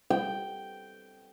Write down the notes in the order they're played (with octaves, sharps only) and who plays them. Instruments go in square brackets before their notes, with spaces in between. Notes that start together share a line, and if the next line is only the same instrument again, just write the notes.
[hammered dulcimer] G5